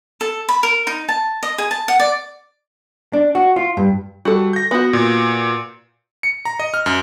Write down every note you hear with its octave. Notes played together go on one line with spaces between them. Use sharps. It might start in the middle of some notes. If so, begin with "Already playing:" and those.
A4
B5
A#4
D#4
A5
D#5
G#4
A5
F#5
D5
D4
F#4
F4
G2
G3 F#4 A4
G6 A#6
B3 F#4
A#2
C#7
A#5
D#5
F6
F#2